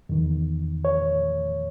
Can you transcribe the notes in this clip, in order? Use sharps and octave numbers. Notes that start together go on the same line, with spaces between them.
E2 D#3
C#5